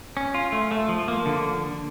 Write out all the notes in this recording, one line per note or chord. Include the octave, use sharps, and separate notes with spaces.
C#4
F4
A3
A3
F3
A#3
D3